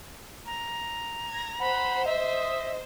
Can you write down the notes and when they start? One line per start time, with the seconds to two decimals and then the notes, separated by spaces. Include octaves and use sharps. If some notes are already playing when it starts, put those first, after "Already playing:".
0.46 A#5
1.28 G#6 A#6
1.60 C5 F#5 B5
2.06 D#5 E5